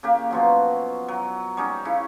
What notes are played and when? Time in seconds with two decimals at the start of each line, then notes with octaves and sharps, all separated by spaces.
0.03 C#3 A#3 G4
0.31 B2 F3 F#3
1.08 F#3
1.57 G3 C#4 D#4
1.85 C#3 E4